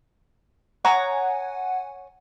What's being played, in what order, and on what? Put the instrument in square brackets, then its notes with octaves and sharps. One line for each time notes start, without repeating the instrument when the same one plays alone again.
[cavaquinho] C#5 A#5 D#6 [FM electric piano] F#5 G#5